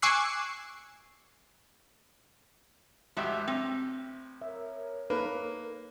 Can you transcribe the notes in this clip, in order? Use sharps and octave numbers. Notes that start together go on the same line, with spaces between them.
G#5 C#6 D6 E6 F#6 C7
A1 F#3 G#3 G4 E5 E6
C4
A#4 C#5 E5
A#3 D#4 A4 B4